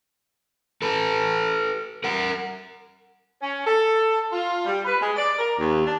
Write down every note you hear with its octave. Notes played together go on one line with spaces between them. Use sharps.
A4 B4
A#4 F#5
C#4
A4
F4
G3
B4
G#3
D5
A#4
D#2
D4